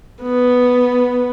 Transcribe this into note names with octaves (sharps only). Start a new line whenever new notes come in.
B3